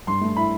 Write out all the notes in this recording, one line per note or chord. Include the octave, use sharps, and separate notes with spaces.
G2 C6
A3
E4 B5